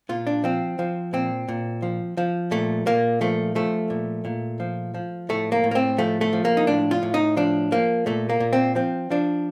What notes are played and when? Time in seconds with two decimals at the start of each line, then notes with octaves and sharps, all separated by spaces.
0.09 A#2 F4
0.27 D4
0.44 F3 C4
0.79 F3
1.13 A#2 C4
1.49 A#2
1.82 F3
2.17 F3
2.51 A#2 A3
2.86 A#2 A#3
3.21 F3 A3
3.55 F3 A3
3.90 A#2
4.25 A#2
4.60 F3
4.94 F3
5.29 A2 A3
5.52 A#3
5.64 A2
5.71 A#3
5.75 C4
5.98 F3 A3
6.21 A3
6.33 F3
6.45 A#3
6.57 D#4
6.67 A2 D4
6.91 F4
7.03 A2
7.14 D#4
7.37 F3 D4
7.72 F3 A#3
8.06 A#2 A3
8.30 A#3
8.40 A#2
8.53 C4
8.75 F3 C4
9.10 F3 D4